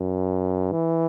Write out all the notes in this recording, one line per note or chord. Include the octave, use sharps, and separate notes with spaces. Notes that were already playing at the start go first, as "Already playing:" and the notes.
Already playing: F#2
E3